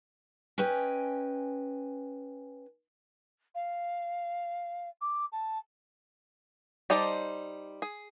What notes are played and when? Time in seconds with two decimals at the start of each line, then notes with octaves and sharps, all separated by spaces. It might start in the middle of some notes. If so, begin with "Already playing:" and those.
0.58 C#4 B4 D#5 G5 G#5
3.55 F5
5.01 D6
5.32 A5
6.90 G3 D#4 C5 D5 A5
7.82 G#4